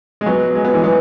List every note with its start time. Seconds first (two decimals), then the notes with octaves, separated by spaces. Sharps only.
0.21 G#3
0.26 F#3 B3
0.55 G#3
0.65 B3
0.74 E3 G#3
0.84 F#3 B3